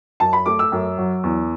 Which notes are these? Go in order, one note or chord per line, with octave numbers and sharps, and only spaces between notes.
F#2 A5
B5
A3 D6
E6
F#2
F#3
E2